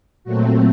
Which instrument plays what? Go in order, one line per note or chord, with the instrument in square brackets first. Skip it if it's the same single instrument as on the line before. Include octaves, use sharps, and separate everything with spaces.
[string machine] A#2 F#3 A3 C4 F#4